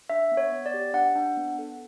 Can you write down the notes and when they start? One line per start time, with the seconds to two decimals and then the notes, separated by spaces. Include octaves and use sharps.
0.10 D4 E5
0.31 B3
0.37 C#5
0.52 B3
0.66 D5
0.74 G4
0.94 D4 F#5
1.16 D4
1.37 B3
1.58 A4